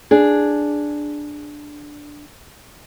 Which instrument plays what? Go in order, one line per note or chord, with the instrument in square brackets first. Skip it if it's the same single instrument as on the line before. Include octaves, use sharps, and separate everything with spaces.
[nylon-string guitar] D4 G#4